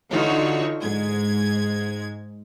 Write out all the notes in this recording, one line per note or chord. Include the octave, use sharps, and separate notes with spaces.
D3 E3 D#4 F4 F#4 C#5
G#2 G#3 G#6